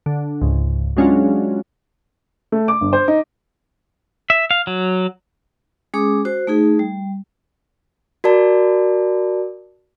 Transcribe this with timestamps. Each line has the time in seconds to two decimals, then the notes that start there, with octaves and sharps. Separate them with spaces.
0.06 D3
0.42 C#2 G#2
0.97 F#3 G#3 C#4 D4 F4 F#4
2.52 A3
2.68 D6
2.81 G1
2.93 C5
3.08 D#4
4.30 E5
4.51 F5
4.67 F#3
5.94 G#3 C#4 G#4 D6 D#6
6.25 F#4 C5
6.47 A3 D#4 G#4
6.79 G3
8.24 F#4 A#4 D5 A5